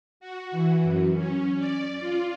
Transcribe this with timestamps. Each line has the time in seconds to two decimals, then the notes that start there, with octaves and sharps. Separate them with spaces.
0.20 F#4
0.51 E3
0.82 F#2
1.15 C#4
1.58 D5
2.00 F4